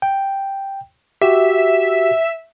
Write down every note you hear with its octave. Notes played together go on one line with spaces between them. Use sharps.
G5
F#4 G4 E5